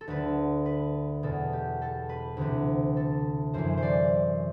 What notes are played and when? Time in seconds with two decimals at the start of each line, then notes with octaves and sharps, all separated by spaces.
0.01 A4
0.08 D2 D3 B4
0.66 B4
1.23 E2 B2 A4
1.53 G4
1.82 A4
2.09 B4
2.37 D2 C3 E3 B4
2.97 A4
3.54 F#2 E3 C5
3.77 C5 D5